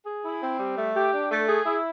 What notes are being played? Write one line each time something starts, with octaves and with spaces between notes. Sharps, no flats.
G#4
E4
C4
G3
A3
G4
D4
A3
G#4
E4